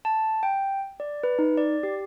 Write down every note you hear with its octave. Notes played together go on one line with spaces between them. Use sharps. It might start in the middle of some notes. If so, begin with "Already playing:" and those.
A5
G5
D5
B4
D#4
D5
G4